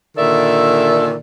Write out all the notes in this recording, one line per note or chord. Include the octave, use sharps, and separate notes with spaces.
A#2 D3 D#3 A4 D5 E5